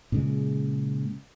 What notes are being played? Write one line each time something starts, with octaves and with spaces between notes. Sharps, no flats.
A#2 C#3 G#3